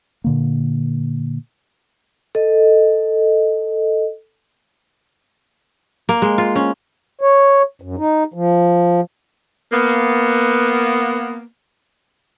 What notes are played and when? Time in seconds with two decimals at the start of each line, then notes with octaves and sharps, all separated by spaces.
0.24 A#2 D3 A#3
2.35 A4 D#5
6.09 A#3
6.22 G#3
6.38 F4
6.55 C#4
7.21 C#5
7.82 F#2
7.98 D#4
8.34 F3
9.71 A#3 B3